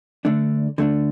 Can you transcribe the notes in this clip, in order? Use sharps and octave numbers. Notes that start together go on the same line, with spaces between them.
D3 A3 D4
D3 A3 D4